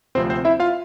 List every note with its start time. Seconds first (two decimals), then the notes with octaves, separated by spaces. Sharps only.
0.15 D2 C3 F3 C4 C5
0.30 C4 C5
0.45 E4 E5
0.60 F4 F5